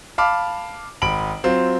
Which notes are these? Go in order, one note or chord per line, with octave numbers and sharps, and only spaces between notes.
F5 A5 B5 D6 F6
G#1 B5 D7 F#7
F#3 C4 F4